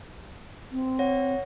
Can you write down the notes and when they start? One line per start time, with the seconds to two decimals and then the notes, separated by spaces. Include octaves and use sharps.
0.72 C4
0.99 C#5 F#5 A#6